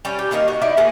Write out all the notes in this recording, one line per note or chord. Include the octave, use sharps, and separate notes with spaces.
G3 C#4
G4
D#3 A#3 D#4 A#4
F#4
D#4 E4 D5
A#3 F#4 G#4